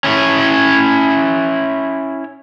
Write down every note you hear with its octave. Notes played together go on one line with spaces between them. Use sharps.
C#4 E4 C#5